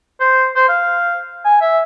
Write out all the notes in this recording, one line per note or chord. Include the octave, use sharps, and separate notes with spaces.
C5
C5
F5
G#5
E5